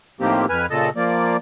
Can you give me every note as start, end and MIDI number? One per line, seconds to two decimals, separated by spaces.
0.21 0.46 45
0.21 0.46 51
0.21 0.46 53
0.21 0.46 58
0.21 0.46 60
0.21 0.46 67
0.49 0.66 41
0.49 0.66 71
0.49 0.66 80
0.49 0.66 89
0.71 0.90 46
0.71 0.90 49
0.71 0.90 69
0.71 0.90 75
0.71 0.90 81
0.96 1.37 53
0.96 1.37 58
0.96 1.37 74